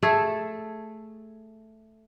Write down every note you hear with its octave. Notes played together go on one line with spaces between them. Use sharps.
A3 G#4 A4